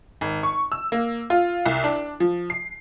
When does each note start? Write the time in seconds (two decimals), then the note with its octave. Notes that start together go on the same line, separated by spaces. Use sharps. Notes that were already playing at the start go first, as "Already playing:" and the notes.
0.21 G#1
0.43 C#6
0.72 E6
0.92 A#3
1.30 F4
1.66 C2
1.84 D4
2.20 F3
2.50 C7